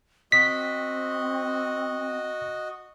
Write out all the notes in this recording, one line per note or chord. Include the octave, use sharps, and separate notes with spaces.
C4 F#4 D#5 B6